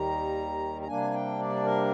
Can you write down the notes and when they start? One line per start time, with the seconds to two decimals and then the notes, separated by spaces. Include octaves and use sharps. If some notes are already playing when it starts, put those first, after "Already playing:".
Already playing: D#2 D#3 G3 A#5
0.81 A#5
0.87 C3 G3 A#3 D4 G#5
1.13 G5
1.39 D5
1.64 A#4